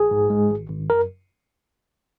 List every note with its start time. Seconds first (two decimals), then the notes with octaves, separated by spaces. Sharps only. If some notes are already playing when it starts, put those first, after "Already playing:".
Already playing: A#1 G#4
0.11 G#2
0.30 G#3
0.50 G#1
0.70 G#1
0.90 F#2 A#4